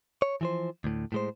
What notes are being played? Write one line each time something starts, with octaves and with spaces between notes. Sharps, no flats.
C#5
E3 F3 C5
D2 A2
A2 G#3 C5